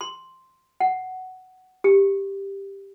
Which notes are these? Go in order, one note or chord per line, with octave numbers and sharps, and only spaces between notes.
C6
F#5
G4